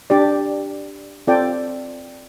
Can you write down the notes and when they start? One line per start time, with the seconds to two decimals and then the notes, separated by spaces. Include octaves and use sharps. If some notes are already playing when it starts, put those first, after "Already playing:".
0.10 D4 G4 D5
1.27 C4 F4 A4 D5 G5